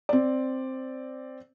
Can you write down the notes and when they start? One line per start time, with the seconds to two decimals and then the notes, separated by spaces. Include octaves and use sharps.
0.09 C4 D5